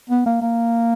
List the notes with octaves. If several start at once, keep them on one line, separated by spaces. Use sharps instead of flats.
B3
A#3
A#3